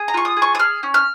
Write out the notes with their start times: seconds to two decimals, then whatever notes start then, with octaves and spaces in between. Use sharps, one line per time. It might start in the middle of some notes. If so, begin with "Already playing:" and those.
Already playing: G#4
0.08 A#5
0.14 F4 C#6
0.25 D#6
0.37 G#4
0.42 C#6
0.55 D#6
0.59 G#4 F6
0.83 C#4
0.94 F6